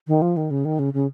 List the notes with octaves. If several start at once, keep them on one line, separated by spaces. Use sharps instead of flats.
D#3
F3
D#3
C#3
D#3
C#3
C#3